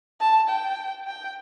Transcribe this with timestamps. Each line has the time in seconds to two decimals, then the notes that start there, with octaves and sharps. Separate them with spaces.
0.20 A5
0.49 G5
1.07 G5